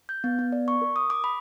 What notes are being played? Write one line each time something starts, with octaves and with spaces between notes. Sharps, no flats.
G6
B3
B3
D5
C#6
A#4
D#6
D6
B5